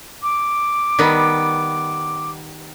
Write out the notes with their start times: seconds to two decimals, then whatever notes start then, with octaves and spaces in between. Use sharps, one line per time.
0.22 D6
0.99 D#3 G3 B3